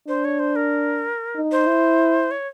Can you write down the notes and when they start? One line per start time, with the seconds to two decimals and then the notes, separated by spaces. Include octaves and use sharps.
0.08 D4 C5
0.25 C#5
0.39 C5
0.56 A#4
1.36 D#4
1.52 C5
1.67 E4
2.31 C#5